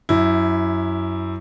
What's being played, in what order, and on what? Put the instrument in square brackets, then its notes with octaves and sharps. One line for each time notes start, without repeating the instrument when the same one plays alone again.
[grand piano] F#2 E4